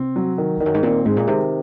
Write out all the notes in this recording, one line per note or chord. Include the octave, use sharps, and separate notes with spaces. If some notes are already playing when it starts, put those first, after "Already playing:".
Already playing: C3 C4
F#3
D#3
F2 D#3
F#2
G#2
A#2 C4
G#2 G#3
A#2
C3 D#3